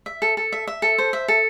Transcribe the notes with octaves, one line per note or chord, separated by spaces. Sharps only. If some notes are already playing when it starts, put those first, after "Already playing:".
E5
A4
A4
E5
E5
A4
C5
E5
A4